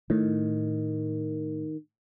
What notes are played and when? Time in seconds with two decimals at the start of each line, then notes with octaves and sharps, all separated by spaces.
0.10 A2 D#3